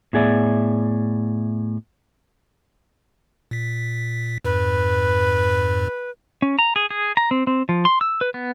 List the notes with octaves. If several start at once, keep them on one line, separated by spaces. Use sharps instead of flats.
A2 B3 G#4 D5 E5
A#2 B6
F2 G#2 B4
C#4
A#5
G#4
G#4
A#5
C4
C4
F3
C6
E6
B4
B3